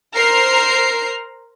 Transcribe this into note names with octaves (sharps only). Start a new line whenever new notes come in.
A#4 C5 A#5 F6 C7